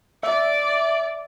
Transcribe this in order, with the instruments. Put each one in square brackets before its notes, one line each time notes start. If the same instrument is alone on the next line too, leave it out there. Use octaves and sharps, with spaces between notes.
[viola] D5 [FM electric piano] E5